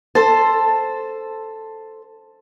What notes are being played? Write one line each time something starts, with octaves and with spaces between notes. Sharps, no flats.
A4 C5 A5